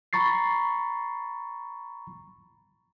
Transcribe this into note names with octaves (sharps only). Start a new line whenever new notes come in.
A#5 B5 C#6 A6 C7